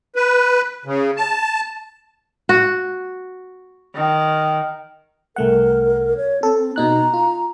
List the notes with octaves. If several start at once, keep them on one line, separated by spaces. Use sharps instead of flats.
B4
C#3
A5
F#4
D#3
C2 A3 A#4 F#5
C#5
C4 A4
B2 D#4 A#5 F#6
F4